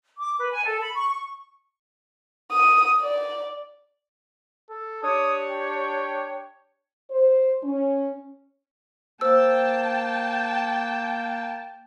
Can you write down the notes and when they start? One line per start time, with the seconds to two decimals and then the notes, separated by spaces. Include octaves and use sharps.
0.19 D6
0.39 B4
0.52 G#5
0.66 A4
0.81 B5
0.96 C#6
1.09 C#6
2.51 D#6
3.01 D5
4.70 A4
5.03 D4 G4 C#5 D#6
5.49 G5
7.10 C5
7.64 C#4
9.21 A#3 C5 G5 A5 E6